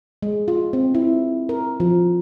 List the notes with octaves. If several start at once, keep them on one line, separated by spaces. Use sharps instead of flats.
G#3
F4
C4
E4
A#4
F3